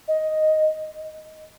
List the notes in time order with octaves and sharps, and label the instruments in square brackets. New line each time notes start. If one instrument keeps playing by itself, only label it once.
[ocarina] D#5